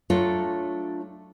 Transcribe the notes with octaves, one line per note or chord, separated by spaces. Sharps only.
F#3 A3 D4 F4 A4 C#5